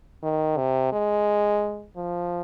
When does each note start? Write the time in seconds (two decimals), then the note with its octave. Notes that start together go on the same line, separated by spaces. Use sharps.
0.23 D#3
0.57 C3
0.92 G#3
1.97 F3